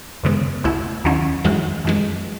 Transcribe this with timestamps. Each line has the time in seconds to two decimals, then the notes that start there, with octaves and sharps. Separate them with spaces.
0.23 F#2 C#3 G#3 B3
0.64 C#2 B2 A3 E4
1.04 D#2 D#3 F#3 C#4 E4
1.45 F#2 E3 G#3 D#4 F#4
1.85 F#2 E3 G#3